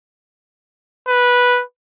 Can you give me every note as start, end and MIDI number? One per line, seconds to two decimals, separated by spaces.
1.08 1.63 71